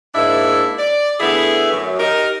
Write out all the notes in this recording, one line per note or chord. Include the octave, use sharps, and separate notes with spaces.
G#2 A#3 D4 E4 E5
D5
D3 A3 B3 E4 G#4
F#2
D#4 G4 A#4